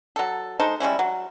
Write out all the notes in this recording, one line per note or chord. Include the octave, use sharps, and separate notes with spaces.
F#3 A4
G#3 D#4 A4 C5
G3 G#3 C#4 E4
F#3